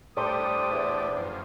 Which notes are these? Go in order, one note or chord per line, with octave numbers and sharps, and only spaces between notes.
A2 G3 D4 G4 A4 C5 D#6
E2
F#2 F3